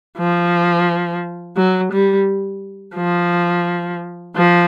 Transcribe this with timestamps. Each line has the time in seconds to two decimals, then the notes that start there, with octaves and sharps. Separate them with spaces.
0.18 F3
1.56 F#3
1.92 G3
2.96 F3
4.36 F3